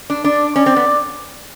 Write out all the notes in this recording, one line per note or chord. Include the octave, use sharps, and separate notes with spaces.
D4
D4 D5
C#4 D5
C4
B3